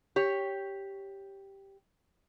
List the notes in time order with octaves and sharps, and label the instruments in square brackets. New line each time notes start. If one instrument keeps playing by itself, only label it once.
[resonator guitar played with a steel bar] G4 C#5